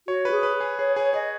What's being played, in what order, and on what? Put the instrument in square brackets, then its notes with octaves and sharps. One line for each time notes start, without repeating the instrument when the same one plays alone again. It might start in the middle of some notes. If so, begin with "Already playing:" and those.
[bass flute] F#4 [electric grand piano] C#5
[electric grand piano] B4
[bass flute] G#4
[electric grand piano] B4
G#4
[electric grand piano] G#4 [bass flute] C#5
[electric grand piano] G#4 [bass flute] C#5
[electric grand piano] G#4 [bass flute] D#5